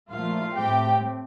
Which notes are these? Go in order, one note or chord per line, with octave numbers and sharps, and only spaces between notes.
A#2 F3 A3 F4 F5
A2 A3 C4 G4 G5